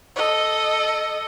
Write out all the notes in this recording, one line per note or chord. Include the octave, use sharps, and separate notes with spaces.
A4 D#5